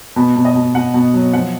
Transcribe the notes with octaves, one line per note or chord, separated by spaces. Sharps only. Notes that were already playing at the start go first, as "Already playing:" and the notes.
B2 B4
B2
D#5
B2
B2 F#5
B2
F#3
F3 F#5